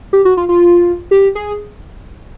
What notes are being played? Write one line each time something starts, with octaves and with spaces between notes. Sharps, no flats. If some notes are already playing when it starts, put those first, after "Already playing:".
G4
F#4
F4
F4
G4
G#4